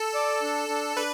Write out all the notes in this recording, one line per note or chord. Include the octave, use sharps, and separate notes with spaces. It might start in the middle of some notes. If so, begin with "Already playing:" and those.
Already playing: A4
D5
D4
D4
D4 B4